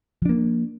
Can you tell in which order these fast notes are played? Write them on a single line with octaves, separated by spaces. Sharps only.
F3 D4 A#3